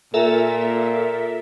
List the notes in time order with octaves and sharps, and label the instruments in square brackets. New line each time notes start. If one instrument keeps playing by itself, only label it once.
[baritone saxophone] A#2 [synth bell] A4 A#4 E5